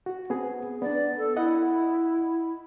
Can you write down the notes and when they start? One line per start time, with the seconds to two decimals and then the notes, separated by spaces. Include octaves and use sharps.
0.06 F#4
0.30 B3 C4 G#4
0.82 B3 D4 D5
1.17 A4
1.36 E4 D#5 F#5